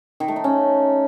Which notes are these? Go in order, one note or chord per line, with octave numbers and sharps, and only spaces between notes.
D#3
A3
D#4
C#4